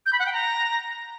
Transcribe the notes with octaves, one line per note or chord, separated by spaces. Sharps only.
G6
B5
F#5
G5
A#5